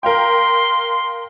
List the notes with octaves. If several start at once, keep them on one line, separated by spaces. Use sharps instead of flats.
A#4 F5 G5 C6